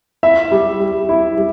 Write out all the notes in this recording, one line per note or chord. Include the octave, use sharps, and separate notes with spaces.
E4 E5
G3
G3
E4
G3